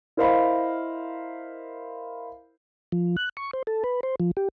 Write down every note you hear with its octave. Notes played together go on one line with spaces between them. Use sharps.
E4 A#4 C5 D#5 F5 B5
F3
F#6
C#6
C5
A4
B4
C5
F3
G4